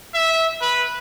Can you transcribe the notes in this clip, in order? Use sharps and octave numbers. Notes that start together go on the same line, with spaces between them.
E5
B4